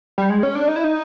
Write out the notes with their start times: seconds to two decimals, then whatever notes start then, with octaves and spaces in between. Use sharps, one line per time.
0.18 G3
0.30 G#3
0.43 C#4
0.55 D4
0.68 D#4
0.76 E4
0.84 D#4